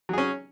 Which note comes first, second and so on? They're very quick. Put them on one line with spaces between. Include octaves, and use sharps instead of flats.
F#3 G#4 C#4